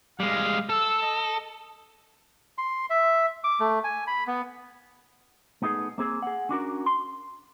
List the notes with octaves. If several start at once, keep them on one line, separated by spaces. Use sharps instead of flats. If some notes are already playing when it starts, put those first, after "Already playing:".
G3 G#3 F5
A4 E6
D#5
C6
E5
D6
A3
G#5
B5
B3
A3 B3 D#4 F4 G#4
A#3 C4 G#4
G#4 F#5
C#4 D4 F#4 A#4
C6